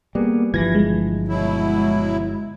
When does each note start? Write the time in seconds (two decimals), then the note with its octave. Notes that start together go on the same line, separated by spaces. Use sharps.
0.15 G3 A#3 B3 G#4
0.54 G1 E3 F3 G#6 A#6
0.75 G#3
1.28 B2 F#3 E4